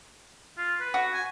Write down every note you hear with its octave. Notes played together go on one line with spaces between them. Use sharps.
F4
B4
F#4
G#5